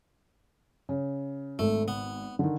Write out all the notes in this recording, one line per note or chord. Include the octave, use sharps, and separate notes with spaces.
C#3
G#1 A3
B3
D3 D#3